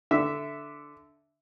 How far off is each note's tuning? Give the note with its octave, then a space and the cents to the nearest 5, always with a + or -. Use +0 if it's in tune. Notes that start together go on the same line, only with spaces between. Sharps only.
D3 -5 E5 +0